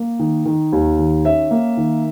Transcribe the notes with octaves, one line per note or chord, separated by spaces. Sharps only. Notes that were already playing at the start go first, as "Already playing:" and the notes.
Already playing: A#3
D#3
D#3
D#2
D#3
C#4 E5
A#3
D#3